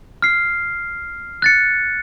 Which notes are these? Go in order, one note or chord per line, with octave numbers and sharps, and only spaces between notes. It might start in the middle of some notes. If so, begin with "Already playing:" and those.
F6 C7
F#6 A6 C#7